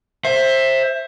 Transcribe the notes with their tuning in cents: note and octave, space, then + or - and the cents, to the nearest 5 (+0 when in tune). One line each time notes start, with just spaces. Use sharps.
C5 +20 E5 +0